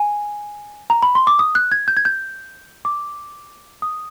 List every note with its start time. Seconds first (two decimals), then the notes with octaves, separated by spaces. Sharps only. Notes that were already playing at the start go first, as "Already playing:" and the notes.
Already playing: G#5
0.90 A#5
1.02 B5
1.15 C6
1.27 D6
1.39 D#6
1.55 F#6
1.72 G#6
1.88 G6
1.97 G#6
2.05 G6
2.85 D6
3.82 D#6